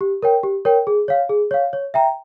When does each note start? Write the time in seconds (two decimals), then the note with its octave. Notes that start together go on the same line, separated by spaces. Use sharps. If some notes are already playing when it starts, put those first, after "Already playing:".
0.01 G4
0.23 A#4 C#5 G5
0.43 G4
0.65 A#4 C#5 G5
0.87 G#4
1.08 C#5 F5
1.29 G#4
1.51 C#5 F5
1.73 C#5
1.94 E5 G5 A#5